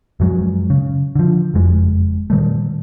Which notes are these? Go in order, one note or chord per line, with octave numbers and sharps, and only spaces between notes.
F#2 F3 F#3 G#3
C#3
D3 F3
F#1 F2 G#3
A#2 D#3 G3 A3